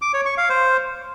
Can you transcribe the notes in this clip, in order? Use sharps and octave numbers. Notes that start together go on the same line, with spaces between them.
D6
C#5
C#6
F5
C5